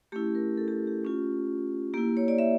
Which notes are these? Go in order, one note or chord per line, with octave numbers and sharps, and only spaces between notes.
A3 C#4 E4 G4
A#4
A4
G4
G4
A3 C#4 F4
A#3 E4 G4
C#5
D5
E5